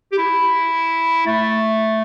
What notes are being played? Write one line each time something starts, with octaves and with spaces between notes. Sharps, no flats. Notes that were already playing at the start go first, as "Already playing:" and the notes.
G4
E4
A3